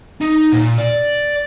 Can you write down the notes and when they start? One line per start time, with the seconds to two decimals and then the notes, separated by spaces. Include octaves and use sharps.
0.21 D#4
0.52 A#2
0.78 D5